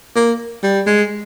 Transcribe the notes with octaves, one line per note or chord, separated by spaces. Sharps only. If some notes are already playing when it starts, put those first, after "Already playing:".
A#3
G3
G#3